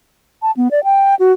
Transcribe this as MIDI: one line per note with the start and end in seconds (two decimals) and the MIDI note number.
0.42 0.51 81
0.57 0.68 59
0.71 0.84 74
0.84 1.15 79
1.19 1.33 66